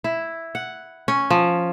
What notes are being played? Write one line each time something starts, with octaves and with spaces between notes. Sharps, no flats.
E4
F#5
C#4
F3